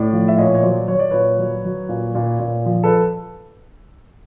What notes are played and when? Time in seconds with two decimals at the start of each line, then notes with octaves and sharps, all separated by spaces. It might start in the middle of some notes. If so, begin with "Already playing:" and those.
Already playing: A2 D5
0.13 F3
0.28 E5
0.38 A#2 C#5 D#5
0.55 C#5
0.63 F#3 C5 D5
0.88 F#3 C#5
0.99 D5
1.11 A#2 B4 C#5
1.38 F#3
1.65 F#3
1.89 A#2
2.15 A#2
2.39 A#2
2.66 F3
2.83 A4 B4